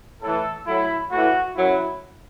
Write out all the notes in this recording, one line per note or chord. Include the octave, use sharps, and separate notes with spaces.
A2 E3 A4
A2 F#3 E4
A2 E3 F#4
F#2 F#3 E4